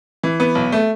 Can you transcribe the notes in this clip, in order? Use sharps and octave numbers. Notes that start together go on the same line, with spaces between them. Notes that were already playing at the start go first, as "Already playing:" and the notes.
E3
B3
B1
A3